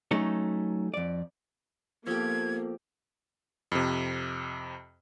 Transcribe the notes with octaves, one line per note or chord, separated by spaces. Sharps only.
F#3 A3 C#4 D#4 C#5
F2 D5
F3 A#3 B3 G4 A4 G#6
F2 C3